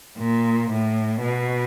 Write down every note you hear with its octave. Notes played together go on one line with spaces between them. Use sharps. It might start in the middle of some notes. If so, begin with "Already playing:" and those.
A#2
A2
B2